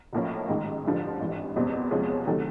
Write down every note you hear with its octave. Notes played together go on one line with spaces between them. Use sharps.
B1 A2 F3 A#3 C#4
A1 G#2 D#3
A1 G2 D3 F3
G#1 G2 E3
F#1 E2 B2 G3 C4
E2 C3 F3 G#3 C#4
C3 D#3 F#3 A3